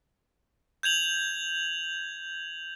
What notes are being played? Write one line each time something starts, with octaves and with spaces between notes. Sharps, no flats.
G6 G#6 F7 F#7